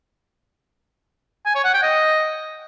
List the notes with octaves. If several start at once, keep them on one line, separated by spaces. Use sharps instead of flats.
G#5
C#5
F#5
G5
D#5